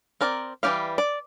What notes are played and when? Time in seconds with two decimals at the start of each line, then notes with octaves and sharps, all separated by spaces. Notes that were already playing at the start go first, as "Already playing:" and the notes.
0.21 C4 A#4 D5
0.63 E3 G3 F4 G4 F5
0.98 D5